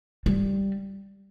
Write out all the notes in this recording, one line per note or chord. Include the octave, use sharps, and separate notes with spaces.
G3